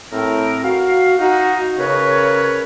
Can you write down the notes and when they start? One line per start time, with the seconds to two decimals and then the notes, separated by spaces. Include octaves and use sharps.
0.12 A2 C4 A#4
0.64 F#4 F5
1.19 D#4 F#4
1.78 C#3 A#4 B4 C#5